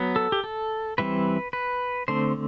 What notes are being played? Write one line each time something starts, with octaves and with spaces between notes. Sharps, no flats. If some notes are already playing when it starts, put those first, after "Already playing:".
Already playing: F#3 B3
A4
G4
A4
E3 G3 C4 B4
B4
D3 A3 C4 C5